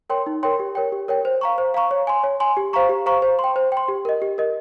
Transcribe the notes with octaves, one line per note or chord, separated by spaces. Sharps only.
A#4 C#5 G5 C6
D#4
A#4 C#5 G5 C6
G4
A#4 C#5 G5
G4
A#4 C#5 G5
C5
F5 A#5 C#6
C5
F5 A#5 C#6
C#5
G#5 C6
C#5
G#5 C6
G4
C5 F5 A#5 C#6
G4
C5 F5 A#5 C#6
C5
G5 C6
C5
G5 C6
G4
A#4 D#5
G4
A#4 D#5